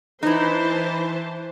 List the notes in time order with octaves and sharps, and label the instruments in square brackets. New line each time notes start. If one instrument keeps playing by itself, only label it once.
[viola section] E3 C5 A5 [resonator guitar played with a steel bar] D#4 E4